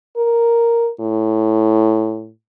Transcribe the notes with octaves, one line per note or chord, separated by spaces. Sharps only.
A#4
A2